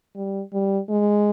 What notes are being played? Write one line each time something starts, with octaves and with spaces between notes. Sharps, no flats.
G3
G3
G#3